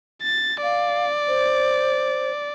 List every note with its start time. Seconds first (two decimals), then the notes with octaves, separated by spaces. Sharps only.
0.22 A6
0.63 D5 F5
1.28 C5